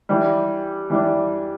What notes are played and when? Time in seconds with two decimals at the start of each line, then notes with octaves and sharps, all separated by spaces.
0.09 E3 G3 D4
0.90 E3 G3 D4